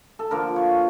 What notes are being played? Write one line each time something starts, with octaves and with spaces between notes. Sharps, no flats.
A4
D3 F3 A#3 A#4
C#5